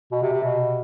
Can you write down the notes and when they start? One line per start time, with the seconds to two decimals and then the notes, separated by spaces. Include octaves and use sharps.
0.12 B2
0.22 C3
0.33 C3
0.43 B2